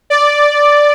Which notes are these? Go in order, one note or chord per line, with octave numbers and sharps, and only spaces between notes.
D5